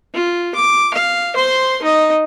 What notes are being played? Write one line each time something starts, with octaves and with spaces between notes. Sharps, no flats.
F4
D6
F5
C5 C6
D#4 D#5